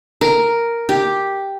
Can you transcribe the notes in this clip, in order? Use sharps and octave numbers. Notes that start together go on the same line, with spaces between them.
A#4
G4